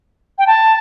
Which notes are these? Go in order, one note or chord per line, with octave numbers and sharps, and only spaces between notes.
G5
A5